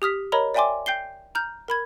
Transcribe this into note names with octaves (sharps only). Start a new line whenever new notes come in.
G4 D#6 F6 B6
A#4 C#5 D#5 A#5 B5
D5 E5 G5 G#5 C6 D6
G5 G6 C7 G7
A#5 F6 G6
A#4 B5 G#6